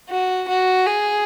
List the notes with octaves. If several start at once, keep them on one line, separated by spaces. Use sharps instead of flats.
F#4
F#4
G#4